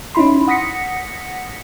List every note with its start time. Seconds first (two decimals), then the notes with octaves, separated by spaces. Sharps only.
0.15 C#4 D#4 E4 B5 C6
0.47 F#5 D#6 A#6 B6 C#7